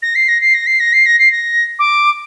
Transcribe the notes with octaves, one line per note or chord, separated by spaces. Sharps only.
A#6
C7
A#6
C7
A#6
C7
A#6
C7
A#6
C7
A#6
D6